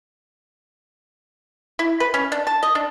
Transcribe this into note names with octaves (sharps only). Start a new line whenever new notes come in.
E4
B4
C#4
D4
A5
D#5
D4